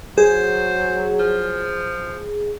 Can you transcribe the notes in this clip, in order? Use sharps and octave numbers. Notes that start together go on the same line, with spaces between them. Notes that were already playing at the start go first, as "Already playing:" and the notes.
F#3 G#4 C5
F3